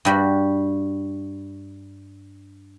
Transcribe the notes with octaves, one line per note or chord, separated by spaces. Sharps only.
G2 G3 F#4